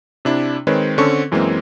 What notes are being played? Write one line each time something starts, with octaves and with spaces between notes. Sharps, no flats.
C3 D4 E4
D#3 G#3 C4 B4 C#5
D3 C4 C#4 A4 C#6
F#2 E3 G#3 A#3 C4